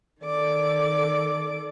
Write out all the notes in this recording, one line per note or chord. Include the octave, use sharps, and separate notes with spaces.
D#3 A4 D5 D6